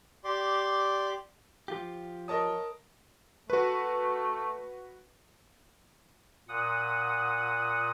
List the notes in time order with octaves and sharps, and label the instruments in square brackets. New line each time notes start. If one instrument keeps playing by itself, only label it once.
[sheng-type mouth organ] G4 D5 C6
[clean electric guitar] F3 F4 G4
[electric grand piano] A#4 A5 D#6 [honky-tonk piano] C#5 D#5
[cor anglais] A3 [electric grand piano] F#4 B4
[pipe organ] A#2 F#5 D#6